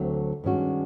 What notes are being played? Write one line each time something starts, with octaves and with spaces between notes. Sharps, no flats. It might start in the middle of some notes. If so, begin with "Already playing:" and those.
Already playing: D2 D3 F#3 A3 C4
G2 D#3 G#3 C#4 F#4